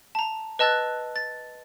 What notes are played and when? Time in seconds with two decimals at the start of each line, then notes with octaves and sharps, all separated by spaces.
0.15 A5 A#5
0.59 B4 D#5 A5 E6 F#6 A6
1.16 A6